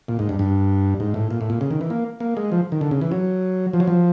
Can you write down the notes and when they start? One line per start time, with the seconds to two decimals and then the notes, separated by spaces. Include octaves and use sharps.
0.08 A#2
0.19 G#2
0.29 G2
0.39 G2
1.00 G#2
1.14 A2
1.31 A#2
1.41 A2
1.50 A#2
1.61 C#3
1.71 D#3
1.81 E3
1.90 A#3
2.20 A#3
2.37 G#3
2.52 F3
2.72 D#3
2.81 D3
2.91 C#3
3.01 E3
3.12 F#3
3.73 F3
3.80 F#3
3.87 F3